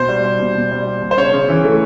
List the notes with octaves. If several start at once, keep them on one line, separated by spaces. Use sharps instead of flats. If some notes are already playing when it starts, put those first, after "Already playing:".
Already playing: B2 C5
G3
G3
B2
B2
G3
G3
B2
C5
C#3 C#5
C#3
E3
A3